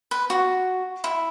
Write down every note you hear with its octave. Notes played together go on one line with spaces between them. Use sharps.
B4
F#4
E4